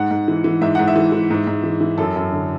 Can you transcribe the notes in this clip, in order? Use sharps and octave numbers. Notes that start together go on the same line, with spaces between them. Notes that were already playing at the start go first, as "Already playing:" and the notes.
Already playing: G#2 F#5
G#2
E3
E3
G#2 E5
G#2 F#5
E5
E3
E3
G#2
G#2
E3
E3
F#2 A4
F#2
D3